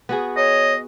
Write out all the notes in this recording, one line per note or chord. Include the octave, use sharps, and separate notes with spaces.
B3 F#4 G#4
C#5 D#5